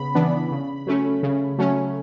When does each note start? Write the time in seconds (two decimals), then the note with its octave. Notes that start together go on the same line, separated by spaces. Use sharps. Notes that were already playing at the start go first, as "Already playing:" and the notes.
Already playing: C#3 B3 B5
0.15 E3 B3 D4
0.51 C#3
0.87 F#3 A3 C#4
1.23 C#3
1.59 F#3 A3 C#4